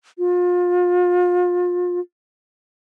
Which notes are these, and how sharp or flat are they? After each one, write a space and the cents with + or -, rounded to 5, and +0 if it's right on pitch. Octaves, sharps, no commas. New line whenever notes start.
F4 +30